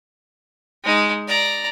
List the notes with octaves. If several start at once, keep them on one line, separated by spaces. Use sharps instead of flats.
G#3 D#4
D5 A#5